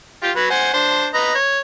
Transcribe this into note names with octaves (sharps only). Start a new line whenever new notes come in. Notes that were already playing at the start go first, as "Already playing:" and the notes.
F4 G4
F#3 B4
C5 F#5 G#5
D4 C5
B4 D#5 A#5
C#5